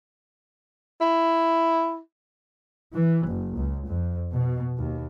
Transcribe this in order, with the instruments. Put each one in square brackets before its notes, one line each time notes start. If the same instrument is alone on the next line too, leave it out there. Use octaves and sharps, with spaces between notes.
[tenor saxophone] E4
[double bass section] E3
F#1
C#2
F2
B2
D#2